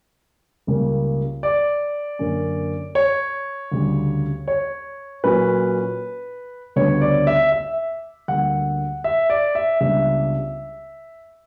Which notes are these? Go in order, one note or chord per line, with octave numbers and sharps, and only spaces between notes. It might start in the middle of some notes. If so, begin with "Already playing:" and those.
C#2 C#3 G3 A#3
D5
F#2 D3 A#3 C#4
C#5
D2 C#3 G3
C#5
A#2 F#3 C#4 B4
D2 C#3 G3 B3 D4 C#5
D5
E5
E5
D2 D3 G3 A#3 F#5
E5
D5
E5
C#2 C#3 G3 B3 D4 E5